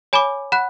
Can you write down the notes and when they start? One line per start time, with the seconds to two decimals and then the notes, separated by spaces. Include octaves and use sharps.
0.13 C#5 G#5 B5 D6
0.52 F#5 B5 F#6